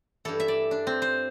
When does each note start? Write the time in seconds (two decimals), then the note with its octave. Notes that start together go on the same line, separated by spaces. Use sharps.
0.25 G2 E3 A4
0.40 E5
0.48 D5
0.71 D4
0.87 C4
1.02 C5